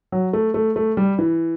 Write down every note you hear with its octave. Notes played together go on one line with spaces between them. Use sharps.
F#3
A3
A3
A3
G3
E3